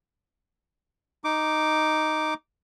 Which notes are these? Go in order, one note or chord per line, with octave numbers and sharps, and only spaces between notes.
D#4 D6